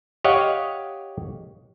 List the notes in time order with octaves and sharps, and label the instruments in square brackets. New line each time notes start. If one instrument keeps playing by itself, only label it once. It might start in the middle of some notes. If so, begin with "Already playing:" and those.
[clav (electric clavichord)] G4 C#5 D#5 F5 F#5